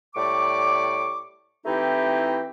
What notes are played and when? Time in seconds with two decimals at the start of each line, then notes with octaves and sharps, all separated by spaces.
0.15 A2 G3 D5 C#6 D6
1.66 E3 A3 C4 D#4 E4 G4